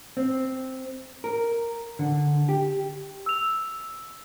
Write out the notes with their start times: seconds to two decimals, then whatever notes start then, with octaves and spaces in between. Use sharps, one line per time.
0.17 C4
1.24 A#4
1.99 D3
2.49 G4
3.26 E6 F7